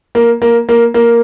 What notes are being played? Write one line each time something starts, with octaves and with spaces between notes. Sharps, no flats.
A#3
A#3
A#3
A#3